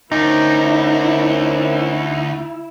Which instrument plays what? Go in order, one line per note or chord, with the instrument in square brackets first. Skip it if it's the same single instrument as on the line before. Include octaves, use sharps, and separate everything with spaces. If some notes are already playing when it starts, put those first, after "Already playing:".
[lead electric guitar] D2 [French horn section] C#4 A#4 C5 [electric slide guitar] D#4 [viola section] E4